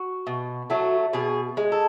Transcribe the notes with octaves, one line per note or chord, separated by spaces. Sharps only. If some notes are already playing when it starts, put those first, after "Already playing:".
Already playing: F#4
B2
F#3 A3
B2 G#4
G#3
A4